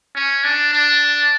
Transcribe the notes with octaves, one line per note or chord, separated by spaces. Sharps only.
C#4
D4
D4